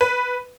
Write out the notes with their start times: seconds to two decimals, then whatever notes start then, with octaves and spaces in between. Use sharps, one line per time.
0.01 B4